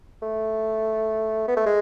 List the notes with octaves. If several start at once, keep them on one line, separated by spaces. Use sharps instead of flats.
A3
B3
A3
G#3